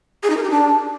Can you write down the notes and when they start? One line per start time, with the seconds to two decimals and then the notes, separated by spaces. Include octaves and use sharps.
0.23 G#4
0.30 D#4
0.37 A#4
0.43 G4
0.50 D4